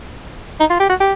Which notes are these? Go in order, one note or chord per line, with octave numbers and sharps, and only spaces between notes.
D#4
F4
G4
F#4
G4